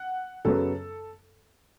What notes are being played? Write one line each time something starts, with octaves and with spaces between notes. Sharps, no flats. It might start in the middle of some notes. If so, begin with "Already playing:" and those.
Already playing: F#5
F#2 C#3 F#3 B3 A4